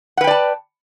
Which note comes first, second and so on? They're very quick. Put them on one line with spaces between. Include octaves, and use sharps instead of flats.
F#5 B4 G5 D5 A5